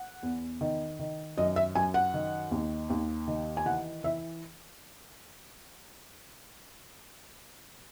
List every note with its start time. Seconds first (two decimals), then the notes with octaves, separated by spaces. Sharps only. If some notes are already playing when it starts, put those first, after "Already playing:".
Already playing: F#5
0.23 E2
0.61 D#3
0.99 D#3
1.38 F#2 D#5
1.56 E5
1.75 F#2 G#5
1.94 F#5
2.14 D#3
2.51 D#2
2.90 D#2
3.28 D#3
3.57 G#5
3.66 E3 F#5
4.04 E3 E5